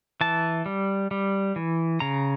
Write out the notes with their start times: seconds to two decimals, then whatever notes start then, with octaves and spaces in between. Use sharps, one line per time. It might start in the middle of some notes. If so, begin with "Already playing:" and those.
0.21 E3 A5
0.66 G3
1.11 G3
1.56 E3
2.00 C#3 A#5